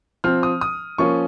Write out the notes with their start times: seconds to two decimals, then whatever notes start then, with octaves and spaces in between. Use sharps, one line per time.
0.24 F3 C4 F6
0.43 D#6
0.61 D#6
0.98 F3 A#3 C#4 C#6